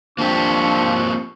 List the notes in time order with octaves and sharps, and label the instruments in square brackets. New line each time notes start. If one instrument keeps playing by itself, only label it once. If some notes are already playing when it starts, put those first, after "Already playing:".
[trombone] F3 [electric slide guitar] A#3 C4 G4 [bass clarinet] D4 [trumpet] C#6